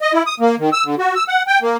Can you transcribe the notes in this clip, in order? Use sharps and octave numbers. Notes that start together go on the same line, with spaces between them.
D#5
E4
D#6
A#3
D#3
E6
D3
F#4
E6
F#5
G5
A#3